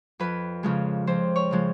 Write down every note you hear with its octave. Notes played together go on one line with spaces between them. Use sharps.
F2 B4
C#3 F3 G#3
F2 C5
C#5
C#3 F3 G#3